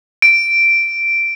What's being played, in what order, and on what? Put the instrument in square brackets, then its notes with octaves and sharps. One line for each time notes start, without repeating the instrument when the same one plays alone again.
[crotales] D7